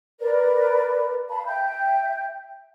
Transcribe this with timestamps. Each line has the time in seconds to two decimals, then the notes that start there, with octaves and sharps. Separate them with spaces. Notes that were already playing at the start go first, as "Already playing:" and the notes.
0.20 A#4 B4 D5
1.30 F5 A5 B5
1.46 E5 G5 G6